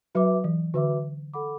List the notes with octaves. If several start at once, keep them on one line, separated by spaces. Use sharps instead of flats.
F#3 F#4 B4 E5 D6
E3
D3 F#4 B4 E5 D6
A4 F#5 B5 D6